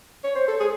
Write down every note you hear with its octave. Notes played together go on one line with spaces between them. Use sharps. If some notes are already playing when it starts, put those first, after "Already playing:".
C#5
C5
A4
G#4